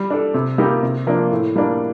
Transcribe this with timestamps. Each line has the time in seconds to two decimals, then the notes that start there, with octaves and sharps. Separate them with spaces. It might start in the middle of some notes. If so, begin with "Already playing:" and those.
Already playing: G3
0.10 D4 A4
0.34 C3
0.58 G3 A#3 D#4 G4
0.83 C3
1.07 F3 A#3 D4
1.31 A2
1.56 G3 A#3 D4